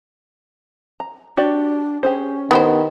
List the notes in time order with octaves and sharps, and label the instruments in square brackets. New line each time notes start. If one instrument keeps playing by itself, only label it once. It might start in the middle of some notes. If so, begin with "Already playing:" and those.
[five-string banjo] A#5
[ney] D4 [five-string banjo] F#4 G4 D5
[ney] C#4 [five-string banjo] G4 G#4 C5
[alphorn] D#3 [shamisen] B3 G4 C5 [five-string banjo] E4